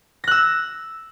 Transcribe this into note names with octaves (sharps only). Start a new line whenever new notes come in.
E6 F#6 A#6